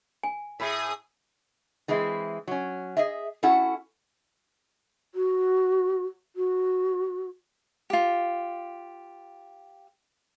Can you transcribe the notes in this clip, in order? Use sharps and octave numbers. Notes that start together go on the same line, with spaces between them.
G#5
A2 G#4 E5 B5 D#6 B6
E3 G#3 C4 E4
F#3 C#4
G#4 D#5 E5
C#4 E4 F#4 A4 F#5
F#4
F#4
F4 G4